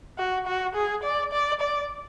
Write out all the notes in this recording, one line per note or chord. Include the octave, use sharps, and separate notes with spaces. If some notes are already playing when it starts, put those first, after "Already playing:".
F#4
F#4
G#4
D5
D5
D5